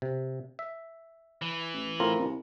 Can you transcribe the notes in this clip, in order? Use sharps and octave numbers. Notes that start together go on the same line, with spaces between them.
C3
E5
E3
A1
A2 C4 F4 A#4
C2